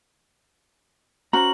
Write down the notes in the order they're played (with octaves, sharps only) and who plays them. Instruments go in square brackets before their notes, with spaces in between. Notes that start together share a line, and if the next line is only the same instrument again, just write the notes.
[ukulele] C#4 F#4 C5 [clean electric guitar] A#5 [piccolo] F#7